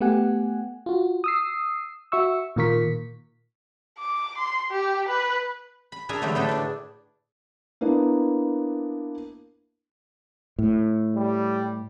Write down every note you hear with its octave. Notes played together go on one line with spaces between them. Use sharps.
A3 B3 G4 F#5 G#5
F4 F#4
D#6 E6 C7
F#4 E5 C#6 E6
A#2 D#3 F4 A#4 C#6 B6
D6
C6
G4
B4
B5
D4 G#4 A#4 E5 G#5 A#5
D3 E3 F#3 A3 E4 G4
A2 D4 G#4 A4 B4 G5
D4 D5
A#3 B3 D4 E4
A2
G3